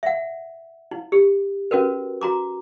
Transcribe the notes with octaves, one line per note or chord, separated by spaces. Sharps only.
E5 F#5
E4
G4
C#4 F#4 A#4 B4
F#4 A#5 D6